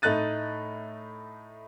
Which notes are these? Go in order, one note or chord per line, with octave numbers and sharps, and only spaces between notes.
A2 A3 D#4 F#6 A6 D#7